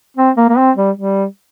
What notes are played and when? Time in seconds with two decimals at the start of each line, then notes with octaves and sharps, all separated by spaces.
0.17 C4
0.37 A#3
0.49 A#3
0.57 C4
0.77 G3
0.97 G3